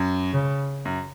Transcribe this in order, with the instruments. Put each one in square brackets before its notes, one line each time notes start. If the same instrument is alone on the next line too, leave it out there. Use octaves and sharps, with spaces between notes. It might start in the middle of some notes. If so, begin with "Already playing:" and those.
Already playing: [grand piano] F#2
[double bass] C#3
[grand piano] F#2